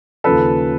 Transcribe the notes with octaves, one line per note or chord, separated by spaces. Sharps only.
D#2 C#3 F3 A4 B4